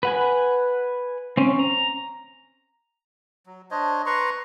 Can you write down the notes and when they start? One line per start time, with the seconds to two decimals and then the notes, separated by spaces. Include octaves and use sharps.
0.03 B4 F#5 G#5
1.37 C4 C#4
1.59 A#5
3.46 F#3
3.71 D4 C5 C#5 D#5
4.06 B4 A#5 C6 C#6